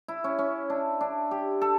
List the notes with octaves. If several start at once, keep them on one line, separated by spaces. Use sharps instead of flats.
E4
C#4
C#4
D4
D4
G4
A4